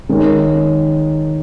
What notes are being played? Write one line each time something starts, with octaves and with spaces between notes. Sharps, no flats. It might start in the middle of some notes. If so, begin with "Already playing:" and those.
D#3 G#3 D#4 A#4 C#5